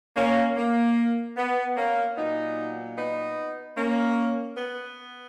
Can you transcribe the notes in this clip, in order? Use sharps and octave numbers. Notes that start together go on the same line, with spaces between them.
A#3 C#4
A#3
B3
A#3 C#4
A#2 F#3 B3 D#4
B3 D#4
A#3 C#4
B3